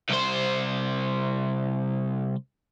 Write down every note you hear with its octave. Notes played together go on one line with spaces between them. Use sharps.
C2 C5